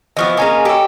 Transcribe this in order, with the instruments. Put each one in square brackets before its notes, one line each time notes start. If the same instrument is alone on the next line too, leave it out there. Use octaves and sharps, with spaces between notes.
[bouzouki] E3 F3 B3 [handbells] D#5 C#6 D#6
[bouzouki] A#3 C#4 G#4 [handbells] D#5 G#5 A#5
[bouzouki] G4 A4 C#5 [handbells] G5 E6